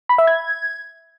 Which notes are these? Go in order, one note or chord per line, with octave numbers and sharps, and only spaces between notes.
B5
E5
G#6